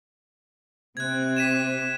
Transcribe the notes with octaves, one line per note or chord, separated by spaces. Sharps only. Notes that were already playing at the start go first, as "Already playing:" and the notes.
C3 C4 F#6 G#6
B6 D#7 E7